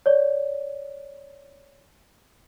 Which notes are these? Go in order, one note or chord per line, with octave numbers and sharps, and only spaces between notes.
C#5 D5